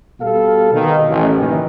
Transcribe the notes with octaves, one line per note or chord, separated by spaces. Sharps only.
B2 G3 A4 F5
B2 D#3
A1
F#1 D#3 E3